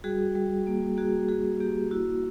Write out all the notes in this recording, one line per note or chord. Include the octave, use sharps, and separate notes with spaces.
G3 F#4 G#4
G3
A#3
A#3 F#4 G#4
G3 F#4 G#4
A#3 G4
E4 F#4